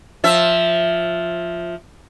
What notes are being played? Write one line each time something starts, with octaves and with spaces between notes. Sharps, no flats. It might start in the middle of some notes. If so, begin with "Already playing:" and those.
F3 E5